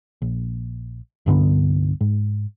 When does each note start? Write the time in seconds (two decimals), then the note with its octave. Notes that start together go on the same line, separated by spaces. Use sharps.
0.22 A#1
1.26 C2 G2 D3 B3
2.01 G#2